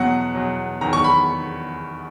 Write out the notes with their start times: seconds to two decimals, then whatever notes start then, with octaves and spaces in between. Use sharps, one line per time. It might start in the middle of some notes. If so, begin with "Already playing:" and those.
Already playing: E2 B2 F#3 F#5
0.35 E2 B2 F#3
0.81 E2 D#3 F#3 A#5
0.93 C#6
1.04 B5